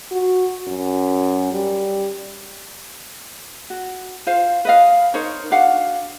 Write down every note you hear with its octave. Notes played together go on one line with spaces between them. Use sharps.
F#4
F#2
G3
F#4
F4 C5 F5
B4 D#5 F5
D#4 A#4 C5 C#5
D4 F#4 F5 F#5